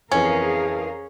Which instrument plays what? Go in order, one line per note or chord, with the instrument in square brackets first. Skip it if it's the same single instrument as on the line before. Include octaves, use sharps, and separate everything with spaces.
[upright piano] F2 E3 [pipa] C#4 [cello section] G#4 A#4 F5